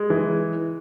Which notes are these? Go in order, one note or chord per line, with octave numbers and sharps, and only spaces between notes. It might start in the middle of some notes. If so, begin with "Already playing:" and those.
Already playing: G#3
E3